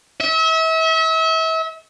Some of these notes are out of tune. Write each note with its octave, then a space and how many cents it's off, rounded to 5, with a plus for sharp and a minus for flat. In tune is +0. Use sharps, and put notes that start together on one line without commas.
E5 -35